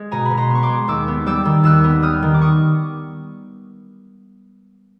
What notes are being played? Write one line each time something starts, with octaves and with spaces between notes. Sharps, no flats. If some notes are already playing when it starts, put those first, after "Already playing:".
Already playing: G#3
B2 G#5 A#5
B5
B2
A#5 C6
B3 C#6
C6 D6
G#3
D#2 D6 E6
B3
G3 D6 E6
D#3
D#2 E6 F#6
B3
G3 D#6 F6
D#3
D6
C#6 D#6